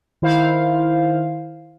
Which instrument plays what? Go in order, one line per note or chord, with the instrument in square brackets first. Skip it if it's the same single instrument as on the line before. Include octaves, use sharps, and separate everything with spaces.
[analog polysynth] D#3 E4 C5 F5